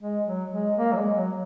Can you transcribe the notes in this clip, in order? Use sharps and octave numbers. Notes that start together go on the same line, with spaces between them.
G#3
F#3
G#3
A#3
F#3
G#3
F#3